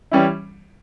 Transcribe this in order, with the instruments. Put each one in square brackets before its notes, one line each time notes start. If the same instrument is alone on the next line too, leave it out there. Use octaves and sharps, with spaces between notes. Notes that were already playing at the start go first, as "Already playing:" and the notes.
[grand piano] E3 G3 C#4 E4